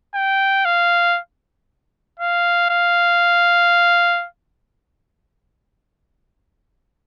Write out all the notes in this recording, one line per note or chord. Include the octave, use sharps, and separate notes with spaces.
G5
F5
F5
F5